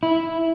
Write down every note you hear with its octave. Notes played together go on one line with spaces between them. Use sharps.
E4